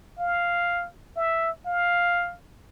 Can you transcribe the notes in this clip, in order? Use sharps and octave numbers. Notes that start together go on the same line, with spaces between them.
F5
E5
F5